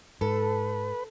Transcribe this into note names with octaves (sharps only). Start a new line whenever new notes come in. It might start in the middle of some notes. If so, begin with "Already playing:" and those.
G#2 A4 B4